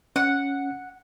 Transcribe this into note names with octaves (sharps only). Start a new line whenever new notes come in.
C#4 F#5